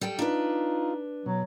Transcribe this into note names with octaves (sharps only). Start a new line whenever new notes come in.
G3 A4 G5
D4 D#4 F4 B4
B2 F#3